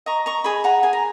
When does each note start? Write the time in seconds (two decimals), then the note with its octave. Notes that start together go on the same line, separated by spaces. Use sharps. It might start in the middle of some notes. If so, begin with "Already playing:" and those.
0.06 D#5 A#5 C#6
0.26 A#5 C#6
0.44 G#4 G#5 B5
0.64 F#5 A#5
0.83 G#4 G#5
0.93 A#5